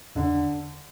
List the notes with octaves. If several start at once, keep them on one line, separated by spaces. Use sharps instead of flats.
E2 D3